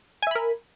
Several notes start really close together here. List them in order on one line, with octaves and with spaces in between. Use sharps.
G#5 E5 B5 A#4